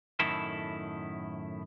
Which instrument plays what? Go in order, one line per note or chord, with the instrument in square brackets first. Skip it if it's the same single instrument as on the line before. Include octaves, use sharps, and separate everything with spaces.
[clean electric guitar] F#2 A2 D#3 E4 A4